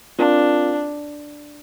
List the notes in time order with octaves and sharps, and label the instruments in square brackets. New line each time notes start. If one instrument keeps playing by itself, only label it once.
[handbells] C4 F4 A#4 F5 [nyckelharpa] D4